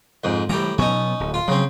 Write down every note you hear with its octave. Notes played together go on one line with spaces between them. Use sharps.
F2 G#2
A2 E3 G3 G4 A#5
B2 F#3 B3 C#4 D#4
D1
F4
C#3 F#3 C4